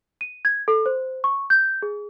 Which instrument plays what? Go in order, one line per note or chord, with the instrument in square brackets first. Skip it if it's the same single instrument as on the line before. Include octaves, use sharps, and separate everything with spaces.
[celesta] D#7
G#6
A4
C5
C#6
G6
G#4